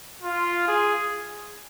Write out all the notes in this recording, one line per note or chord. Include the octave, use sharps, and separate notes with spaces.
F4
G#4